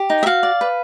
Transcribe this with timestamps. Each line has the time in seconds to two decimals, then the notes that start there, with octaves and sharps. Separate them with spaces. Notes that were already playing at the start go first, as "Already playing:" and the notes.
Already playing: G4
0.10 D#4
0.23 E5
0.26 F#4 F5
0.43 D5
0.61 B4